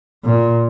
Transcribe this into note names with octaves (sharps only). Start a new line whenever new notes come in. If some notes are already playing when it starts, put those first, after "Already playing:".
A#2